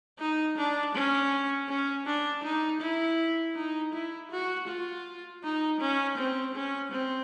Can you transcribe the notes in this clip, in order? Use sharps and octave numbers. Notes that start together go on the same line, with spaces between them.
D#4
D4
C#4
C#4
D4
D#4
E4
D#4
E4
F#4
F4
D#4
C#4
C4
C#4
C4